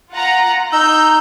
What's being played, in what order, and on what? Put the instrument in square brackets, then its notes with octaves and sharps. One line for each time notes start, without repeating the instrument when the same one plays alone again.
[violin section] F4 F#5 A#5
[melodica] D#4 E6 [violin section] G6